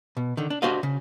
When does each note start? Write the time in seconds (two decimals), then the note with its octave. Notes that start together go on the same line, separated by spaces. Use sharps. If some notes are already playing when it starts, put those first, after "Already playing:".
0.17 B2
0.37 D3 D#3
0.50 D4
0.62 D4 F#4 G4 C5 D#5 F5
0.83 C#3